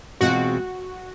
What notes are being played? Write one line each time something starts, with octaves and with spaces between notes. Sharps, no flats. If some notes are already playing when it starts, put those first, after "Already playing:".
E2 B2 G#3 C4 F4 F#4